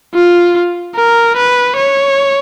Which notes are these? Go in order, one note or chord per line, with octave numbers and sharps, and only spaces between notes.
F4
A#4
B4
C#5